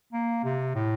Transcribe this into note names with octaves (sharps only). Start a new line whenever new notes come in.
A#3
C3
A2